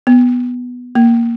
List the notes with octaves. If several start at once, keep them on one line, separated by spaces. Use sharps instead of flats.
B3
A#3